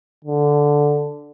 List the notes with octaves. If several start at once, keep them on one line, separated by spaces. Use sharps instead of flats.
D3